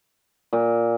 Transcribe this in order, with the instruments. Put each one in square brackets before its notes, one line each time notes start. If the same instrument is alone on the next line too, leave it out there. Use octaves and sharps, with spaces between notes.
[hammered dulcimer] A#2